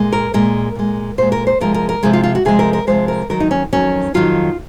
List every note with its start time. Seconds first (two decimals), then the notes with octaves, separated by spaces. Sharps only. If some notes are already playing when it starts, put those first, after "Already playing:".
Already playing: A#2 G#3
0.13 A#4
0.34 A#2 G#3 A#4
0.76 A#2 G#3
1.18 A#2 G#3 C5
1.32 A#4
1.47 C5
1.60 C3 F3 G#3 A#4
1.74 A#4
1.89 A#4
2.03 C3 F3 G#3 G#4
2.13 F4
2.23 F4
2.35 F#4
2.45 C3 F3 G#3 G#4
2.59 A#4
2.73 A#4
2.87 C3 F3 G#3 C5
3.08 A#4
3.30 F2 D#3 F#3 A#4
3.40 D#4
3.51 C#4
3.73 F2 D#3 F#3 C#4
4.14 F2 D#3 F#3 F4